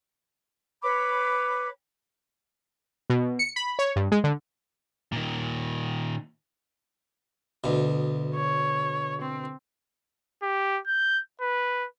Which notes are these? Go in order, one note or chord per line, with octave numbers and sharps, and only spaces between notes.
B4 C#5 B5 D6
B2
C#7
B5
C#5
G2
G#3
D3
A#2 D#3
D2 B2
C#5
C4
G4
G6
B4